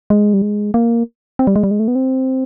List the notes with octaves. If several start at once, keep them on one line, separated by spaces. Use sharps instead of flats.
G#3
G3
G#3
A#3
C4
G3
G#3
G3
G#3
A3
B3
C4